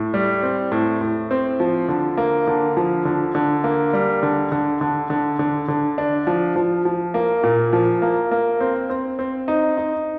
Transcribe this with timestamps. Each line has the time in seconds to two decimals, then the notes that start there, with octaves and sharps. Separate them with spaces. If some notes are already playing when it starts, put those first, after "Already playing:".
Already playing: A2
0.14 G3
0.43 C4
0.72 A2
1.01 A2
1.31 C4
1.60 F3
1.89 D3
2.17 A#3
2.47 D3
2.77 F3
3.05 D3
3.35 D3
3.64 A#3
3.93 G3
4.23 D3
4.52 D3
4.81 D3
5.10 D3
5.39 D3
5.68 D3
5.98 D4
6.27 F3
6.56 F3
6.85 F3
7.14 A#3
7.43 A#2
7.73 F3
8.02 A#3
8.31 A#3
8.60 C4
8.90 C4
9.19 C4
9.48 D#4
9.77 D#4